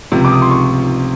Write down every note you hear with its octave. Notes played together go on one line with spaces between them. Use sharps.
C#2 C3 F3
D6
D#6
C6
C#6